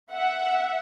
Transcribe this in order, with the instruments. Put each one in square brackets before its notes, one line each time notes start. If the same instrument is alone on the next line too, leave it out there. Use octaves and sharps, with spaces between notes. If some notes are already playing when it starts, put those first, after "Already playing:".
[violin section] E5 F#5